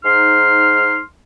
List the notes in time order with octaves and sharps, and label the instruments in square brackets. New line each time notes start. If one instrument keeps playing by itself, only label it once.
[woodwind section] G#2 D#4 C6 F6